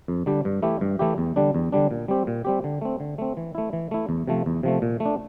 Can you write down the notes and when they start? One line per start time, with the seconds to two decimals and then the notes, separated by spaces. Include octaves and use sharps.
0.08 F2
0.26 D3 G3 D4 G4
0.45 G2
0.63 E3 A3 E4 G4
0.81 G2
0.99 E3 A3 E4 G4
1.18 E2
1.36 D3 G3 D4
1.55 E2
1.72 D3 G3 D4
1.91 A#2
2.08 G3 C4 G4
2.27 A#2
2.45 G3 C4 G4
2.64 D3
2.81 A3 C4
3.00 D3
3.18 A3 C4
3.37 E3
3.55 A3 E4
3.73 E3
3.91 A3 E4
4.09 E2
4.27 C3 F3 A3
4.46 E2
4.63 C3 F3 A3
4.82 A#2
5.00 A3
5.05 D4